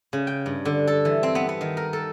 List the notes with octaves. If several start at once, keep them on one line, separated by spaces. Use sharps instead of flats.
C#3
G5
G2
D3
A4
E3
C4
B3
B3
D#3
A#4
A4